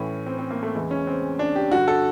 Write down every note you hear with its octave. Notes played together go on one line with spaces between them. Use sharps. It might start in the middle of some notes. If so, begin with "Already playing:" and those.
Already playing: A2 E3 C#4
C4
C4
A#3
A3
E2 C#3 E3 G#3
C#4
C4
D4
G4
G2 D3 F#4
A4